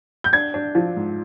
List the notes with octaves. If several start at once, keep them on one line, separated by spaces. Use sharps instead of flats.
G6
D4 G#6
D4
F3
G#2